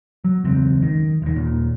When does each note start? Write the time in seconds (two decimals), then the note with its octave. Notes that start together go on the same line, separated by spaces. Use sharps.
0.24 F#3
0.44 E1 C#2 F#2 C4
0.83 D#3
1.22 D#1 D#3
1.36 D#1 D#2 A#2